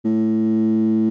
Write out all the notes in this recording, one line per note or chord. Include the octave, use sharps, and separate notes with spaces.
A2